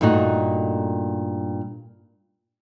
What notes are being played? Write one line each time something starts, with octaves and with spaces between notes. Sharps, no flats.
G2 A#2 A3 D#4 F4 F#4